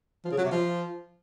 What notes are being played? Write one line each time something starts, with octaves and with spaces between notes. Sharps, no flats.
F3
C#3
F#3
C3
F3